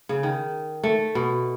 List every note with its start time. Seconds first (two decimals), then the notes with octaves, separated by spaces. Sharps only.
0.09 C#3
0.23 D#3
0.84 A3
1.15 B2